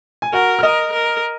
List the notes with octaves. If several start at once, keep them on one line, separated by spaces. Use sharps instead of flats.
G#5
F#4 A#4 F#5
F6
A#4 D#5 D#6
A#4